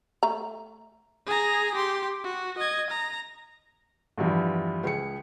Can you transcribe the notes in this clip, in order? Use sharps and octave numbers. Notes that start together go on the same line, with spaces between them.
A3 A#5
G#4 A#5
G4 C6
F#4
D#5 G#6
A#5
E2 G2 E3 F3
C#2 G#4 C#7